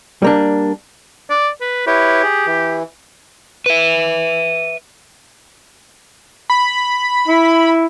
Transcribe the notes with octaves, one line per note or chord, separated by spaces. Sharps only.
G3 A#3 D4
D5
B4
E4 G4 B4 C#5
G#4
E3
B4 E5
B5
E4